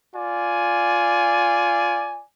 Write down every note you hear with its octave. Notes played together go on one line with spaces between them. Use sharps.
F4 D5 G#5